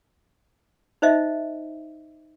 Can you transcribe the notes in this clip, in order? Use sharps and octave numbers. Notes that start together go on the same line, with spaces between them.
D#4 C5 D#5 E5